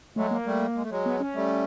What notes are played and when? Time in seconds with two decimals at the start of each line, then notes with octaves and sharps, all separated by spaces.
0.16 F#3 G#3 A3
0.31 A#3
0.46 G3 A3
0.75 G#3
0.83 A3
0.90 F#3 G#3
1.06 B3
1.20 C#4
1.34 G3 A3